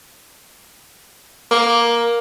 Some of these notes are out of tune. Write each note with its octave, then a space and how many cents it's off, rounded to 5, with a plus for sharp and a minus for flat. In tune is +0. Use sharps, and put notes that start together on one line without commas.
A#3 +10